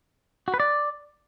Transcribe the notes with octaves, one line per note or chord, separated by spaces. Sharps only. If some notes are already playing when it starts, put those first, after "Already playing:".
F#4
B4
D5